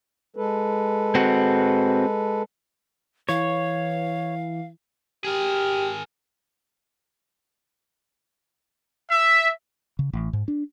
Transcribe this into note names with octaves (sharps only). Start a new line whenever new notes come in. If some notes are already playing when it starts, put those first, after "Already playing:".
G#3 A4 B4
C4 F#4
E3 C#5 F5
G4 G#4 A#4
E5
C#3
A1
G#2
D4